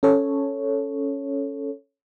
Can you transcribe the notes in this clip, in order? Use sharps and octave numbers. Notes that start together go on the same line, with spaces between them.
C#4 A4 C#5